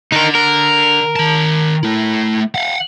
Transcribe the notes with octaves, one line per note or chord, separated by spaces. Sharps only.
D3 D#4 A#4
A#4
D#3 A5
A3 E4
F5 F#5